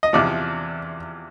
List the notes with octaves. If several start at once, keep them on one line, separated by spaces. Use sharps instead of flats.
D#5
E2 C3 F3 D5